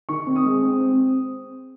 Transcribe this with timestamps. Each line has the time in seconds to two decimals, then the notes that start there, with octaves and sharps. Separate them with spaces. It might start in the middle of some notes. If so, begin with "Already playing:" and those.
0.09 D#3 C#6
0.27 C4
0.36 D#6
0.45 G#3
0.63 C4
0.81 C4